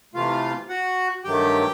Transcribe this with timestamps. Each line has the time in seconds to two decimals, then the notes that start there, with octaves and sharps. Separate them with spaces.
0.14 C3 E3 A3 F4 F5
0.69 F#4 F#5
1.24 G2 D#3 F#3 A3 G4 G5